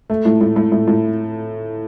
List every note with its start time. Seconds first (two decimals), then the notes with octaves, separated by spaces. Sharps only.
0.10 A3
0.25 A2
0.41 A2
0.56 A2
0.72 A2
0.87 A2